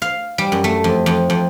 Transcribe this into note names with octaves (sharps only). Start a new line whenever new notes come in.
F5
G3
F#2
A3
F2
F2
F2